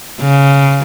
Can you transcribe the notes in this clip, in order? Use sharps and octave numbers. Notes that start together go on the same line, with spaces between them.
C#3